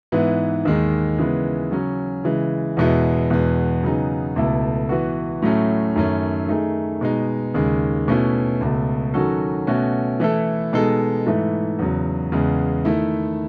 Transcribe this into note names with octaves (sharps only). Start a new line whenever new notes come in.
G#2 E3 B3 E4
D#2 D#3 G#3 D#4
C#3 E3 G#3 B3
C#3 F#3 C#4
C#3 E3 G#3
E2 B2 G#3 B3 E4
E2 B2 G#3 B3
C#3 F#3 B3 D#4 G#4
C#2 B2 A3 E4 A4
E3 B3 F#4
A2 F#3 A3 C#4
F#2 D#3 A3 C#4
D#3 A3 D#4 G#4
B2 G#3 D#4
D#2 C#3 G#3
B2 A3 C#4 E4
C#2 B2 A3
D#3 F#3 C#4 F#4 A4
B2 A3 C#4 F#4
E3 A3 E4 A4
B2 G#3 D#4 A4
G#2 E3 A3
E2 C#3 F#3
E2 C#3 G#3 B3
D#3 A3 E4